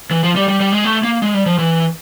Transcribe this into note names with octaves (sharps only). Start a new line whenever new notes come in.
E3
F3
G3
G3
G3
G#3
A3
A#3
G#3
G3
F3
E3